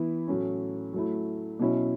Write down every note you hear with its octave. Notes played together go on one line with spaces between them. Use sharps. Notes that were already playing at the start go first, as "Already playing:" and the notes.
Already playing: E3 B3 E4
A2 F#3 A3 C#4
F#3 A3 E4
B2 F#3 C#4 E4